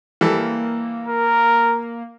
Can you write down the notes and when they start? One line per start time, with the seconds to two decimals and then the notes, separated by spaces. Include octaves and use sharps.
0.21 E3 G3 A#3 A4
1.08 A#4